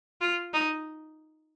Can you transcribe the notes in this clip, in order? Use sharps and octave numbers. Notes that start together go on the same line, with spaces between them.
F4
D#4